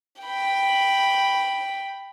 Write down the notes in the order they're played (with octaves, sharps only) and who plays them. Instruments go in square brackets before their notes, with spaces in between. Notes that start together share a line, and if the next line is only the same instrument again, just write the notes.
[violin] G5 B5